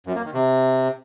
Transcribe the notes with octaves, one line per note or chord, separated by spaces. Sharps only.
F#2
A#3
D#3
C3